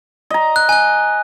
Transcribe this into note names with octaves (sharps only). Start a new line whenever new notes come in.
D#5 A#5
F#6
G#5 F#6